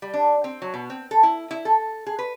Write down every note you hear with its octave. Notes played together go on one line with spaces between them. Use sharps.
G3
D4
C4
F#3
B2
C4
A4
E4
E4
A4
G#4
B4